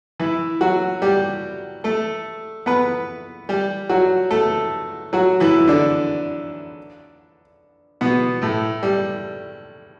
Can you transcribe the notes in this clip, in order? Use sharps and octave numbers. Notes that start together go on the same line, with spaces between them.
E3 E4
F#3 F#4
G3 G4
A3 A4
B3 B4
G3 G4
F#3 F#4
A3 A4
F#3 F#4
E3 E4
D3 D4
B2 B3
A2 A3
G3